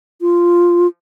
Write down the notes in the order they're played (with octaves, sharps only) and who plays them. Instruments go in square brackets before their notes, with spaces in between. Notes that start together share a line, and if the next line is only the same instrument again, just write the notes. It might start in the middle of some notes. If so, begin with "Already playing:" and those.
[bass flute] F4